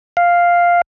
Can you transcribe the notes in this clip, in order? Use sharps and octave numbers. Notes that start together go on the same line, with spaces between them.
F5